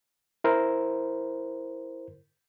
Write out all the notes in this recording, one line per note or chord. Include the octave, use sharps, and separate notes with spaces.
E4 A#4 C5